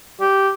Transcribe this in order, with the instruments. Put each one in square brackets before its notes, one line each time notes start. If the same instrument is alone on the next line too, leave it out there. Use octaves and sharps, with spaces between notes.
[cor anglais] G4